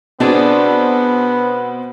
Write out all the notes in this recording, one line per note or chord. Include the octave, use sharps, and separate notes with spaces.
B2 B3 C4 D4 G#4 D5